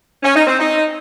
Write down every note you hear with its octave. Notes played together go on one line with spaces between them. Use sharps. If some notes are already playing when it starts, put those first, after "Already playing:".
C#4
D#4
C4
D#4